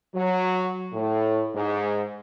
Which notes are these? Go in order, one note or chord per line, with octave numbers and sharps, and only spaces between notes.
F#3
A2
G#2